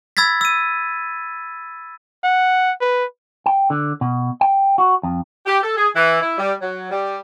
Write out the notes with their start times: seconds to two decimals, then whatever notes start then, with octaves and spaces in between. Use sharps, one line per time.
0.17 B5 E6 G#6 A6 B6
0.41 E6 D#7
2.24 F#5
2.81 B4
3.46 G5
3.70 D3
4.01 B2
4.41 G5
4.78 F#4
5.03 F2
5.46 G4
5.62 A4
5.76 G#4
5.95 E3
6.20 E4
6.38 G3
6.61 F#3
6.91 G3